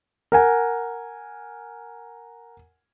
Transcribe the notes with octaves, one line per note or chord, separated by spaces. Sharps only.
A#4 F#5 G#5